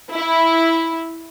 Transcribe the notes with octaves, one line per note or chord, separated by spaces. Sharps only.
E4